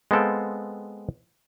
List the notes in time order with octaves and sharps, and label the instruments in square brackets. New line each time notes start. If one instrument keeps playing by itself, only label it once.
[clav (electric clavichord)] G#3 B3 C4 A4 F5 G5